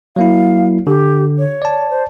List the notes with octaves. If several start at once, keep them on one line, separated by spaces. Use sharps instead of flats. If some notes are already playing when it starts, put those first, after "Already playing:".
F#3 A#3 E4 F5
D3 G4
C#5
D5 A5
C5